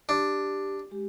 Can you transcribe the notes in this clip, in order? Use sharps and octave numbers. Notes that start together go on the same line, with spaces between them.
D4 G4
G#3 G4